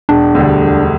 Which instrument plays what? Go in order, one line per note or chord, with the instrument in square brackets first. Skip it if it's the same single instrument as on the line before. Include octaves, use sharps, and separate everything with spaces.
[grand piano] E1 [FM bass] D4
[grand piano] D2 D3 G3
E1